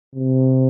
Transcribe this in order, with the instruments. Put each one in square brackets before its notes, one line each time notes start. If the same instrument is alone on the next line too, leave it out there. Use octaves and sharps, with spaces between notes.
[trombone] C3